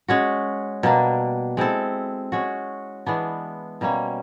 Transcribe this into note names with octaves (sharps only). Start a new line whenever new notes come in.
G#3 C#4 F#4
B2 G3 A#3 D4
G#3 C4 E4 A4
G#3 C#4 F#4
E3 G#3 B3 D4
B2 G3 A#3 C#4